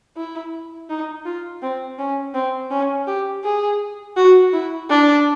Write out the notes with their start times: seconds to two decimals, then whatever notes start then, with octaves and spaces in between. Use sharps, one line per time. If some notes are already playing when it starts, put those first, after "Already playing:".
0.17 E4
0.90 D#4
1.25 F4
1.62 C4
1.99 C#4
2.34 C4
2.71 C#4
3.07 G4
3.44 G#4
4.16 F#4
4.53 E4
4.90 D4